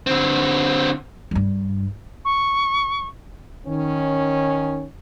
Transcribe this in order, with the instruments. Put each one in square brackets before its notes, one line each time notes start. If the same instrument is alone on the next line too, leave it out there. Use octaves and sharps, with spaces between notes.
[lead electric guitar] D3 C4
[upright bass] G2 G3
[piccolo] C#6
[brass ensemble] D#3 C#4